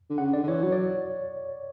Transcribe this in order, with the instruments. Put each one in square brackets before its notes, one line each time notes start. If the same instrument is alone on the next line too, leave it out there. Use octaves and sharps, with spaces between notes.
[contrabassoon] D3
[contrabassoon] C#3 [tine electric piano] F#5
[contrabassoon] D3 [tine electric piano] D5
[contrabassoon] D3
[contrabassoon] E3 [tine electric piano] C#5
[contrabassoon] F#3 [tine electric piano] C#5
[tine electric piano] D5